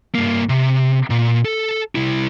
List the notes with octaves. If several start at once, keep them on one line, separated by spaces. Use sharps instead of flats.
G2 A#3
C3
A#2
A4
C2 E4